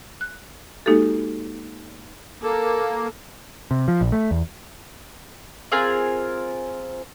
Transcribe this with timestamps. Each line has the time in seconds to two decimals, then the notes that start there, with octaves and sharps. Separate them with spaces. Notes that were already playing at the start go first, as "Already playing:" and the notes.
0.21 F#6
0.86 G#3 A#3 D#4 F#4 G4 A4
2.42 A#3 A4
3.71 C3
3.88 F3
4.01 A#1
4.12 A3
4.31 E2
5.72 C4 F4 G#4 A#4